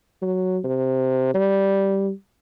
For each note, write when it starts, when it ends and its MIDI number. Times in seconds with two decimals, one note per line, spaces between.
0.22 0.59 54
0.64 1.30 48
1.34 2.11 55